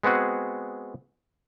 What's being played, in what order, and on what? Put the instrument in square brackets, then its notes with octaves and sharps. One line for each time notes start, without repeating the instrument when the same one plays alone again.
[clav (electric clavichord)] G#3 B3 C4 F#4 G#4